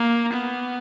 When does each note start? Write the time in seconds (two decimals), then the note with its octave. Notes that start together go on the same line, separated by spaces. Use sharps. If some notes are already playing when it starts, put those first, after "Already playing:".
Already playing: A#3
0.32 B3